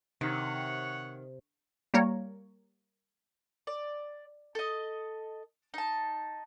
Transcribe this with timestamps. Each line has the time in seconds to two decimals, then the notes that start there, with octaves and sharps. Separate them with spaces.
0.21 C3 D#3 C#5 F#5
1.94 G3 A#3 A#4 C#5
3.67 D5
4.55 A4 D#5
5.74 D#4 A5